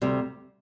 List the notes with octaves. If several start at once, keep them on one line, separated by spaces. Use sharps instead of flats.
D2 C3 G3